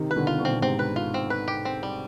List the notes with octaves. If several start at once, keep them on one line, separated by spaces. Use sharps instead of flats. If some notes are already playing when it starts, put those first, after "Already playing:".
Already playing: C3 D#3
B4
B2 D3
F4
B2 D3
C4
B2
G#2 C3 C4
B4
F4
C4
B4
G4
C4
G3